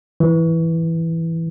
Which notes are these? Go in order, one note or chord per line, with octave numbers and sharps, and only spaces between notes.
E3